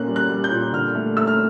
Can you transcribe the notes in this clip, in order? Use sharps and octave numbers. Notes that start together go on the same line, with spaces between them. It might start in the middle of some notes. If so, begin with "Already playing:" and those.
Already playing: A#2 A#3 C#4 F#6
G3
F#6
G3
G6
A#2
D3 F6
A3
A3 E6
F6